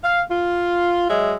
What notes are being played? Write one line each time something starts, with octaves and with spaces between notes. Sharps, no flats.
F5
F4
F#3 G#3 D#5 E5